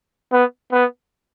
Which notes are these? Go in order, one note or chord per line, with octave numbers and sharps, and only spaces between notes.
B3
B3